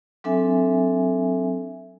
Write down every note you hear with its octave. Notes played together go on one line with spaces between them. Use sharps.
F#3 C4 D4 A4 E5 G#5